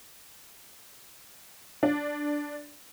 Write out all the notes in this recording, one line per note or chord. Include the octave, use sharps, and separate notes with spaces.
D4